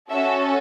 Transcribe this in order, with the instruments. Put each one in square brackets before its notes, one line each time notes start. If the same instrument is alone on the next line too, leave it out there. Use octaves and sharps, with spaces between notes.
[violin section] C#4 F#4 A4 E5